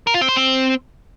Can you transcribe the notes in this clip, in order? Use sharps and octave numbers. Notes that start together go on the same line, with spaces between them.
A#4
F4
C4
C5
C4